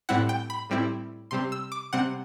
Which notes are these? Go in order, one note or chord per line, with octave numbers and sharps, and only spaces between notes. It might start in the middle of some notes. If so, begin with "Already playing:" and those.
A2 G3 C4 E4 F#5
G5
B5
A2 G3 C4 E4
C3 G3 C4 C6
E6
D6
C3 G3 C4 F#5